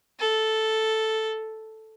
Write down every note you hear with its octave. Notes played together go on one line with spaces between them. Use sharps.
A4